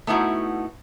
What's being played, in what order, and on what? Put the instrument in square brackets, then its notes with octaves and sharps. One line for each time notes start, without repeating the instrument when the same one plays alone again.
[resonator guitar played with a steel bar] A3 B3 D#4 E4 F#4